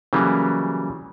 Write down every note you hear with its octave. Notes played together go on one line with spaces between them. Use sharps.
C#3 E3 F#3 G3 A#3